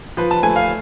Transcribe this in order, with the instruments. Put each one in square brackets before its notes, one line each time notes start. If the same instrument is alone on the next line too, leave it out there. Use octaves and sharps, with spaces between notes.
[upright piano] F3 B4
A5
A3 G#5
F5